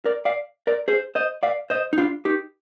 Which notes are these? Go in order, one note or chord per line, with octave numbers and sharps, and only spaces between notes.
A#4 D5
D5 F5
A#4 D5
G#4 C5
C5 D#5
D5 F5
C5 D#5
D#4
D4 F4
D#4 G4